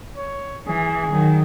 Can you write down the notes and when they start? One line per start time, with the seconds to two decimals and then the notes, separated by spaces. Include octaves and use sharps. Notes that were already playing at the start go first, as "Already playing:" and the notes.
0.17 C#5
0.67 E3 G#4
1.12 D#3 F#3